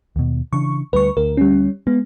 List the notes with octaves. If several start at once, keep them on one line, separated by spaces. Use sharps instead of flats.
D#2 B2
C#3 E3 D4 C#6
D2 G3 B4 C#6
D2 A#4
G3 C#4
G#3 B3